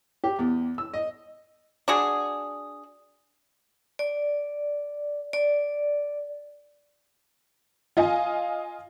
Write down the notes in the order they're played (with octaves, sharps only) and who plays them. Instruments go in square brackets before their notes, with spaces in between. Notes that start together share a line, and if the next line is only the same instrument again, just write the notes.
[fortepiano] G4
E2
E6
D#5
[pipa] D4 F#4 G#4
[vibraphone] D5
D5
[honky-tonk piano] F4 D#5 F5 G#5